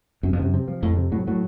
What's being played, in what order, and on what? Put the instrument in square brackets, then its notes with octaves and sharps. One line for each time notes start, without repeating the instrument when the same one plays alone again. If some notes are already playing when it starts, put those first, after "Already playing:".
[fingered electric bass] F#2 [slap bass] C3
[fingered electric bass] F2
[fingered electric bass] F#2 [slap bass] C3
[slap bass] C3
F3
[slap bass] F2 [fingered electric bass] A2
[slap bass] C3
[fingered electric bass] A2 [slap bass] F#3
[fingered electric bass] A2 [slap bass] F#3